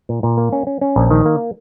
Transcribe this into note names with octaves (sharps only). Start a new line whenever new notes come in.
A#2
A#2
A#3
C#4
C#4
C#4
A#1
D#3
A#3